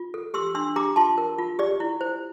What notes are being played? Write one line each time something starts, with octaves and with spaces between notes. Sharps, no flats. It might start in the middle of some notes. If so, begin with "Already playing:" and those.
Already playing: F4
A4
G4 C6 E6
D4 C6 E6
G4 A#5 D6
F4 A5 C6
A#4
F4
G4 D5
E4
C5